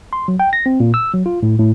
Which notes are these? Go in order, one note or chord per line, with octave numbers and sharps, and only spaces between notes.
C6
F#3
G5
A#6
C4
A#2
E6
F#3
F4
A2
A2